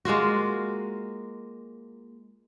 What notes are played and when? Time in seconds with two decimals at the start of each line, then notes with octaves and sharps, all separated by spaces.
0.05 G#3 A#3 F4 F#4